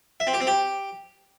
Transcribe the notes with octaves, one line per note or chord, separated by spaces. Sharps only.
E5
C4
G4
C4
G4